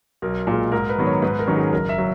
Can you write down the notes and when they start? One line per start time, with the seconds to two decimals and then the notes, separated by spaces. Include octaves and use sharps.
0.22 B1 A#4
0.47 A#2
0.52 G#3
0.72 G#2 A#4
0.89 B4
0.98 D#3 F#3 B3
1.06 C#5
1.22 G#2 B4
1.39 A#4
1.47 D#3 F#3 C#4
1.56 G#4
1.72 F#1 A#4
1.89 E5
1.98 F#3